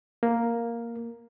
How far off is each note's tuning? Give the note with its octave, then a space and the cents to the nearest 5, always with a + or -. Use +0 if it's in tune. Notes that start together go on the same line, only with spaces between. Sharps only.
A#3 +0